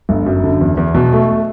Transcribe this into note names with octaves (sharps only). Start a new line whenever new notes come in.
G1
F#2
D3
E2
E2
B2
A3